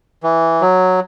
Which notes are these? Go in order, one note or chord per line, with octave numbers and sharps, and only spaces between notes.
E3
F#3